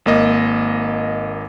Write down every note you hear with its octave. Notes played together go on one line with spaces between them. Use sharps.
G#1 A#3 D#5